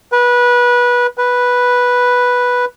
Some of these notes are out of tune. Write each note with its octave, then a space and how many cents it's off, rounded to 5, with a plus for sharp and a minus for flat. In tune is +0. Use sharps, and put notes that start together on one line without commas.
B4 -20
B4 -5